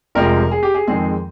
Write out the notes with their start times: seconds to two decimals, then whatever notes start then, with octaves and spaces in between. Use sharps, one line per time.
0.15 F1 F2 C3 F3 G#3 A#4
0.51 G#4
0.63 G4
0.74 G#4
0.87 F2 D#3 G#3 C4 G#4